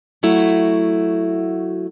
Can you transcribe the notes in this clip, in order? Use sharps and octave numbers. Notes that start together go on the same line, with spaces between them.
F#3 A3 E4 F#4